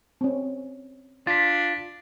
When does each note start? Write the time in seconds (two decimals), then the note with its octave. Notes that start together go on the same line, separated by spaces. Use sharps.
0.21 C4 C#4
1.27 D4 F4 A6 B6